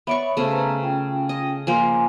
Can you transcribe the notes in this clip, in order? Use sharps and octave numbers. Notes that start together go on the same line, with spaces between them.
B3 C#5 D5 E5 B5 C#6
C#3 A3 B3 F#4 C5
B4 A#5
C#4 F4 G5
D#5
F3 A#3 G#5 C6